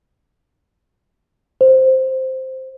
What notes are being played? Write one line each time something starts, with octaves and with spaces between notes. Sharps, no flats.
C5